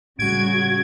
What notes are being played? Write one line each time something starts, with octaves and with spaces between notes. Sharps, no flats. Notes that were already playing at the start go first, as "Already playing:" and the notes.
A2 C#3 G3 F#4 G#6 D7